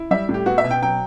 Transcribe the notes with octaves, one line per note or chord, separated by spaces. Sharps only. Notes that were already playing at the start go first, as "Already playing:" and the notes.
Already playing: E4
G3 E5
A2
G4
B3 F#4
E5
B2
G5
F#3 G5